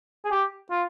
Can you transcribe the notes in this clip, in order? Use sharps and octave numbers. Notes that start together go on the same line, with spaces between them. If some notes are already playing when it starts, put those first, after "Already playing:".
G#4
G4
F4